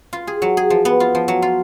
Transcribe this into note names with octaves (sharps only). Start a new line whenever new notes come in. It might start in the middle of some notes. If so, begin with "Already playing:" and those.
F4
G#4
F#3
G#4
F3
B3
F4
F3
F#3
F4